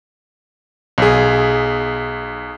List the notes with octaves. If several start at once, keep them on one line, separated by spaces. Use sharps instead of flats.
B1 G#4